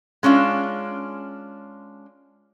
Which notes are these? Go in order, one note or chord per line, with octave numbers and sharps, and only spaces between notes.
G#3 C#4 D4 F4